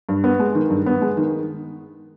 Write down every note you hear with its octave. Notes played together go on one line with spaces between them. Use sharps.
G2
B3
G#3
D#3
G2
B3
G#3
D#3